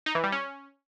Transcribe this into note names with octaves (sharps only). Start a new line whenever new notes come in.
D#4
E3
G3
C#4